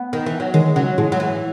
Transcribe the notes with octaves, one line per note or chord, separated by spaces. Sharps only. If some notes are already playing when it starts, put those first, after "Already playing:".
Already playing: B3
D#3
E3
F#3
D#3 G#3
C#3 F#3
A2 G#3
F#3
E3